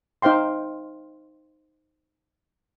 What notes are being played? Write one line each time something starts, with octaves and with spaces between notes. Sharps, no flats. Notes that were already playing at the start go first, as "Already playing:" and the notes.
D#4 C5 F5 G5 C6